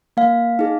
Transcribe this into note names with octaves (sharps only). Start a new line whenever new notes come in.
A#3 F5
D#4 G#4